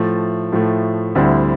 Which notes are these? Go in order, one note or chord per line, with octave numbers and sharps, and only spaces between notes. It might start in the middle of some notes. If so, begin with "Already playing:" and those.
Already playing: A2 F3 A3
A2 F3 A3
D2 D3 G3 C4 E4